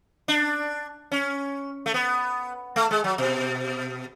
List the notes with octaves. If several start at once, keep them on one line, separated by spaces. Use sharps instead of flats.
D4
C#4
A3
B3
A3
G#3
F#3
B2